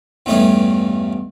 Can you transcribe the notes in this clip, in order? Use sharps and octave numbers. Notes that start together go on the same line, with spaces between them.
E2 G2 A3 C#4 D#4